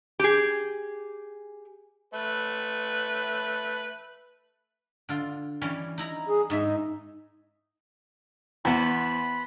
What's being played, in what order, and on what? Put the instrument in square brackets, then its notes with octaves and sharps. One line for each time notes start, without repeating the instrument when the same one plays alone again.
[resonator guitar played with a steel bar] G4 G#4
[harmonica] A3 B4
[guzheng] D3 F4
E3 G3 C#4
D#4 E4 A#5
[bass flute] G#4
[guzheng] G#2 G#4 E5 [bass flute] D#4
[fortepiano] E2 [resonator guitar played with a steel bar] B3 C5 [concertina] B5